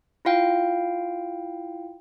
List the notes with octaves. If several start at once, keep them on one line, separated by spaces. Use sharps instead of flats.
E4 F4 F5 G5